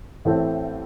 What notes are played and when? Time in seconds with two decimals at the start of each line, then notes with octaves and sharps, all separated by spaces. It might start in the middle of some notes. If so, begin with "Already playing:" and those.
0.25 A1 A2 E3 C4 A4